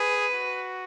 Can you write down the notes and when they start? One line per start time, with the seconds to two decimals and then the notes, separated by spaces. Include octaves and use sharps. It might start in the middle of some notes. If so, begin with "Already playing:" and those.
Already playing: G#4 B4
0.34 F#4